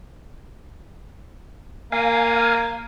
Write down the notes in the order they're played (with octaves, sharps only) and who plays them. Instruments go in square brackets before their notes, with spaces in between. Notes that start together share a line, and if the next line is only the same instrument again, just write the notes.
[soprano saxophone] A#3 [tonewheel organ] F5 G#5